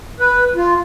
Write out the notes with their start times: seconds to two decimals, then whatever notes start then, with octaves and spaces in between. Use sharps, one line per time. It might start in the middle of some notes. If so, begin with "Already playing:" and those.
0.20 B4
0.55 F4